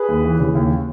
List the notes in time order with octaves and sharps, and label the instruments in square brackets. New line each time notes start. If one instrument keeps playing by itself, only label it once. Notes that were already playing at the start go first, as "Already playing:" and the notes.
Already playing: [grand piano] G#4 B4
D#2
E3
C#3
D#2